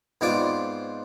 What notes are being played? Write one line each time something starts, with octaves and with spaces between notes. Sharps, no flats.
G#2 B3 C4 F4 D5 D6